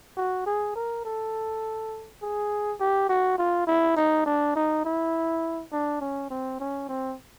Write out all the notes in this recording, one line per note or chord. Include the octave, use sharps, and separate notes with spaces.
F#4
G#4
A#4
A4
G#4
G4
F#4
F4
E4
D#4
D4
D#4
E4
D4
C#4
C4
C#4
C4